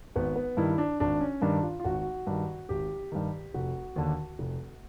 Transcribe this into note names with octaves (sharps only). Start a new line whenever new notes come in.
G#1 B3
B3
G2 D#3 E4
D4
G#1 D4
C#4
G2 D#3 D4
F4
F4
G#1 F#4
G2 D#3
G#1 G4
G2 D#3
F1 F#4
D#2 D3
F1